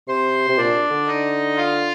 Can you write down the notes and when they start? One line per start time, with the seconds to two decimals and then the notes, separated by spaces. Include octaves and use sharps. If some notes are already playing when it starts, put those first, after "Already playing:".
0.08 C3 C5 C6
0.49 C3
0.58 A#2 D4 D5
0.91 D3
1.07 D#4 D#5
1.57 F4 F5